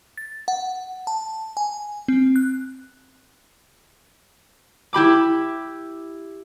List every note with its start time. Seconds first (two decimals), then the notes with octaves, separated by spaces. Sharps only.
0.18 A6
0.48 F#5
1.07 A5
1.57 G#5
2.08 C4
2.36 F#6
4.93 E4 G4 B5 D6